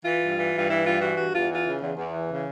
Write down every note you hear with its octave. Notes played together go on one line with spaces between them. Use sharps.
E3 F4
G2
E3
G2
F4
E3 E4
G2 F4
E3 F#4
G2 F#4
E2 F4
E3
F4
C#3
E2
E2
E3
C#3